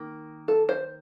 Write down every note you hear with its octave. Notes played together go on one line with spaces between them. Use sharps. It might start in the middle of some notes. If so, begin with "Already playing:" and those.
Already playing: D#3 A#3
A4
C5